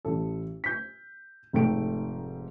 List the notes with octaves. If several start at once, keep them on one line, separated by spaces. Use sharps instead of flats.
A1 A4
G6 B6
F1 G#2 A3 G5 D7